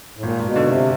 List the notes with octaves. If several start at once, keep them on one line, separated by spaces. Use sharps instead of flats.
A2
G#1 A#2
G#1
B2
D3
C3